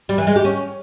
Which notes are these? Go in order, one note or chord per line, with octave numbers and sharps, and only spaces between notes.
G3
E3
G#3
G4
C#4